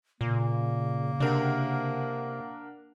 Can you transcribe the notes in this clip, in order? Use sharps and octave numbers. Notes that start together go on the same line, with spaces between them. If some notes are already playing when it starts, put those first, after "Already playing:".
A#2 C#3 A#3
C3 D4 A#4 F#5